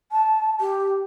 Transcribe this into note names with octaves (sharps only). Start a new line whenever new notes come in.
A5
G4